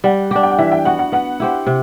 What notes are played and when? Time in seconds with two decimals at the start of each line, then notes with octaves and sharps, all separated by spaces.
0.04 G3 F#5
0.31 D4 G4
0.43 G5
0.51 F#5
0.59 E3 E5
0.72 G5
0.85 B3 F#4 F#5
0.99 F#5
1.12 B3 F#5
1.40 E4 G4 C5
1.66 C3